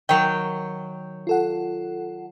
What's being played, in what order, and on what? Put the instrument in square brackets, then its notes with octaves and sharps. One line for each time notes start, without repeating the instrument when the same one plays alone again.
[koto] D#3 F#3 [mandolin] G5
[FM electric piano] F4 A4 F#5